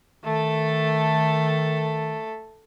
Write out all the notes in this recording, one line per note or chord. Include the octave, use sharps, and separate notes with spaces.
D#3 A3 A4